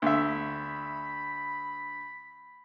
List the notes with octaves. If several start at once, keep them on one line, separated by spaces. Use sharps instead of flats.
D2 E5 B5